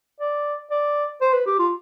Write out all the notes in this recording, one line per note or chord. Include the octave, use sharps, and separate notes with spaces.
D5
D5
C5
B4
G4
F4